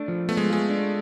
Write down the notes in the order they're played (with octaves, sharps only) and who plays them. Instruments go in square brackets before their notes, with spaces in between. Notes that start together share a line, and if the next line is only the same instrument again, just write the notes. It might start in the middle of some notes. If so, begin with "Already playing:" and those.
Already playing: [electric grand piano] A3 [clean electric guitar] D4
[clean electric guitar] F3
[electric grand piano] A3 [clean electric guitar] B3
[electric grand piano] G#3
[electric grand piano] G#3 [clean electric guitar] F4
[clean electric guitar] D4